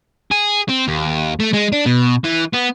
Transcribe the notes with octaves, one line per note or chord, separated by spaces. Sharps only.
G#4
C4
D#2
A3
G#3
D4
B2
E3
B3